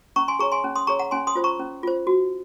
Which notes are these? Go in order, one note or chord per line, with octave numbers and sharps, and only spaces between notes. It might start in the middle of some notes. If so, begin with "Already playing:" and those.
C#4 A#5 C#6
G#5 C6
G#4 C#5 A#5 C#6
G#5 C6
C#4
C6 D#6
G#4 C#5 A#5 C#6
F#5 A#5
C#4 G#5 C6
C6 D#6
F4 C5
A#5 C#6
C#4
F4 C5
F#4